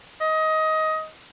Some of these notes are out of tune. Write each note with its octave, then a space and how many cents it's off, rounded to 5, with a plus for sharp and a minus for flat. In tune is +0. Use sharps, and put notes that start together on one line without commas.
D#5 +20